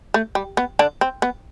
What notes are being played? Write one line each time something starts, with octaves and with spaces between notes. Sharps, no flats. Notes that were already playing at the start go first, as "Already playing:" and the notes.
A3
G3
B3
D3 D4
C4
B3